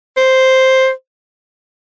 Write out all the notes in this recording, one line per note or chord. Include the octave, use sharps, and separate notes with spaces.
C5